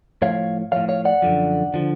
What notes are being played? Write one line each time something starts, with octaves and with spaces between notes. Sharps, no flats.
A2 F3 C#5 F5
A2 F3 C#5 F5
C#5 F5
D5 F#5
F#2 D3 F3
D3 F3